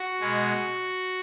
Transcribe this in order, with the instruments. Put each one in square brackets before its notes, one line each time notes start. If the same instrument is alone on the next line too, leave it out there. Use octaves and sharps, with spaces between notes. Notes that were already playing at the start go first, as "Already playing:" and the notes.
Already playing: [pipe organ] F#4
B2 G#3